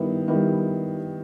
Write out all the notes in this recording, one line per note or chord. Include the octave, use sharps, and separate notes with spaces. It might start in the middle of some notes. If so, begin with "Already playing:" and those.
Already playing: D#3 G3 B3 E4
D#3 G3 B3 E4